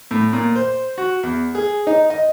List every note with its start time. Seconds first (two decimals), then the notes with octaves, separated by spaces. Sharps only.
0.11 A2
0.33 A#2
0.56 C5
0.98 F#4
1.23 E2
1.55 G#4
1.87 D#4
2.10 D#5